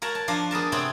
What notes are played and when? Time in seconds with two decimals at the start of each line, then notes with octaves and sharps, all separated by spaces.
0.02 A#4 C#5 F#5 A5
0.15 A5
0.28 F3 D4 F5 A#5
0.51 B3 G#4 A#4 A5
0.72 C3 B3 C4 C#5 F#5 G5